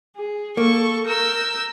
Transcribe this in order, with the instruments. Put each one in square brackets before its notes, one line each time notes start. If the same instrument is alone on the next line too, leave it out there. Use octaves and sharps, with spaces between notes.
[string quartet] G#4
[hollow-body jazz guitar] A#3 [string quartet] A4 C#6
[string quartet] A#4 E6 G6